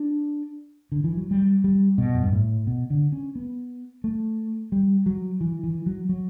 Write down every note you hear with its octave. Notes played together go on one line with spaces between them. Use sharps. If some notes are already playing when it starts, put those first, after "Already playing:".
Already playing: D4
D3
E3
F#3
G3
G3
B2
F#2
G2
A2
B2
D3
C#4
B3
A3
G3
F#3
E3
E3
F#3
F#3